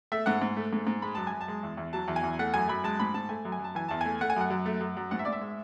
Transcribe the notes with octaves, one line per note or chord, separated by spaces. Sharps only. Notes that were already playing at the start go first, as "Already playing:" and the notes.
A3 E5
G#2 F#5
G#2
A3
G#2
G#2
G#3 B5
F#2 A5
G#5
F#2
A5
G#3
E2
E2
F#3 A5
E2
G#5
E2
A3 F#5
F#2 G#5
F#2 B5
G#3 A5
G#2 B5
G#2 A5
A3 G#5
F#2
G#5
F#2 A5
E3 G#5
E2 A5
A3 G#5
A3 F#5
G#5
F#2 F#5
F#2
A3
F#2
F#2
G#2 F#5
E5
G#2 D5
E5
G#3